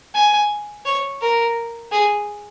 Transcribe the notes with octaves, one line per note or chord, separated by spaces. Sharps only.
G#5
C#5
A#4
G#4